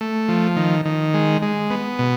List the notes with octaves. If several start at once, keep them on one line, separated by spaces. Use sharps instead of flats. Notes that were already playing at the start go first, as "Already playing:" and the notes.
A3
F3
D#3
D#3
G#3
G#3
B3
B2